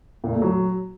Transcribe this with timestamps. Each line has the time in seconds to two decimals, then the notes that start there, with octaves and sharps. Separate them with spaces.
0.24 A#2
0.33 A3
0.42 F#3